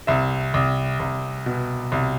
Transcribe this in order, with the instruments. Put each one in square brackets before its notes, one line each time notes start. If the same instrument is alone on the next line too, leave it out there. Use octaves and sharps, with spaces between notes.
[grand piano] C2 E5
C2
C2
B2
C2